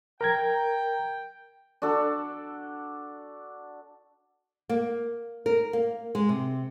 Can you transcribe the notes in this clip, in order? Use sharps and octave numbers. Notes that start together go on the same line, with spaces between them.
A#4 G5 A#5 G#6
D4 F#4 A4
A#3
A#4
A#3
G#3
C3